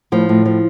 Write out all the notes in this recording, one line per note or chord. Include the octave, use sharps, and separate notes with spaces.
A2 F3
A2
F3